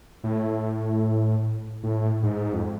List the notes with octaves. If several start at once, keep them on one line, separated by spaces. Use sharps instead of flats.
A2
A2
G#2
F2